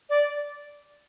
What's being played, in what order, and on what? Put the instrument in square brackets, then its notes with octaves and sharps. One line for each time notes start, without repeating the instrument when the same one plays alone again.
[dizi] D5